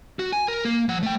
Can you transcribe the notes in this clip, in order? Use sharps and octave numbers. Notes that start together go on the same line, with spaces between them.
F#4
G#5
A#4
A#3
F3 F#5
A3 G5